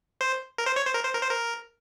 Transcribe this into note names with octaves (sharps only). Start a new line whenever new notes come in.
C5
A#4
C5
C#5
C5
A#4
C5
A#4
C5
A#4